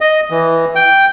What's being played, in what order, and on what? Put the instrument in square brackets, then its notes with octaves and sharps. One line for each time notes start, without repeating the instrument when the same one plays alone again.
[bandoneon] D#5
E3
G5